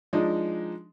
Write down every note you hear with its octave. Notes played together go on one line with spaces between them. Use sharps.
F3 G#3 D4 D#4